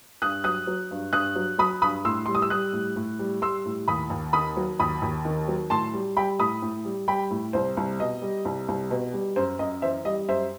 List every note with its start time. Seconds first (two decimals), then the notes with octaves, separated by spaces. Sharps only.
0.22 G2 D#6 F#6
0.44 F#3 D#6 F#6
0.67 F#3
0.91 G2
1.13 G2 D#6 F#6
1.36 F#3
1.58 F#3 B5 D#6
1.82 G2 B5 D#6
2.05 A2 C6 E6
2.26 G3 C6
2.35 D#6
2.42 E6
2.50 G3 D#6 F#6
2.73 A2
2.96 A2
3.19 G3
3.41 G3 C6 E6
3.65 A2
3.88 D#2 B5 D#6
4.10 D#2
4.33 D#3 B5 D#6
4.57 F#3
4.80 D#2 B5 D#6
5.02 D#2
5.25 D#3
5.48 F#3
5.70 A2 A5 C6
5.93 G3
6.16 G3 G5 B5
6.39 A2 B5 D#6
6.62 A2
6.85 G3
7.08 G3 G5 B5
7.31 A2
7.53 C2 C5
7.77 C2
8.00 B2 D#5
8.22 G3
8.45 C2
8.68 C2
8.91 B2
9.13 G3
9.36 F#2 C5
9.59 F#2 D#5
9.82 E3 C5 E5
10.05 G3 D#5
10.28 F#2 C5 E5